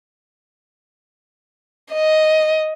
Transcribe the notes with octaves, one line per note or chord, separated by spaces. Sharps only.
D#5